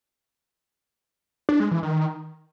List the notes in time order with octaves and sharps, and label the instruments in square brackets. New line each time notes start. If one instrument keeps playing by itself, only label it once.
[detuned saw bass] D4
G#3
E3
D#3